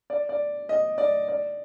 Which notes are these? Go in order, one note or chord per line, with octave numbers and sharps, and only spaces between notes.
D5
D5
D#5
D5
D5